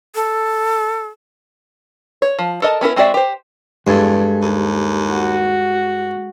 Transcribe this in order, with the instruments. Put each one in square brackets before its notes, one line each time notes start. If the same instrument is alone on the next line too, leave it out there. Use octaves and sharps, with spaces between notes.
[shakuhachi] A4
[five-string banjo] C#5
F3
A4 A#4 D#5 A5
B3 C#4 E4 A#4
G#3 C4 F#4 D5 E5
G4 C5
[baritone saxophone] E2 [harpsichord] G2 [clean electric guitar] G#3 G#4 A4
[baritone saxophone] D#2
[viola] F#4